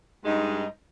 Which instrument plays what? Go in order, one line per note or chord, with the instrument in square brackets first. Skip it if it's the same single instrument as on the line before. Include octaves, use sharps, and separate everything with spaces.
[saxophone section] G2 G#3 D#4